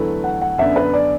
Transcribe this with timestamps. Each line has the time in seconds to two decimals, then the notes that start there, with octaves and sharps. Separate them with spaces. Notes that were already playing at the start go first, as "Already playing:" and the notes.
Already playing: E2 D3 F#3 A3 E4 B4
0.24 F#5
0.42 F#5
0.58 F#2 D3 B3 D4 E5
0.76 B4
0.94 D5